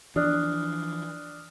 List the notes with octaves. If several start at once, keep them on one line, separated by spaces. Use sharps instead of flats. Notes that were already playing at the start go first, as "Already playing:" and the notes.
E3 F3 D4 D#6 F6 F#6